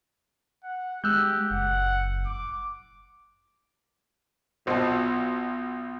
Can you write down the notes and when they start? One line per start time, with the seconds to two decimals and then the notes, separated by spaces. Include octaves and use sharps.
0.63 F#5
1.04 G#3 G4 E6 F#6 G6
1.50 F#1 F#5
2.26 D6
4.67 B1 B3 F4 F#4 C5 D#5 A5